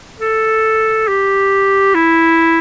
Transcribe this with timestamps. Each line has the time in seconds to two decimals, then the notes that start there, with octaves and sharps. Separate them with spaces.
0.20 A4
1.08 G4
1.95 E4